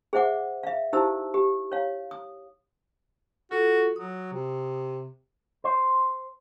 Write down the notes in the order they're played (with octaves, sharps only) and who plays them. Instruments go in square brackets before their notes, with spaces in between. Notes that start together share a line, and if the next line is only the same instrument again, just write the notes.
[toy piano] G#4 C5 E5 F#5 D6
E5 F5
D#4 E4 G4 C5 A5 E6
G4
C#5 F5
D#6
[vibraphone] F4 A4 [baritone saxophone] F#4
[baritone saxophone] F#3 [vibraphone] D#6
[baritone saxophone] C3
[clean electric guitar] C5